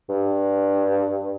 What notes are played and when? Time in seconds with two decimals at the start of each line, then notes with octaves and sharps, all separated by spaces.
0.09 G2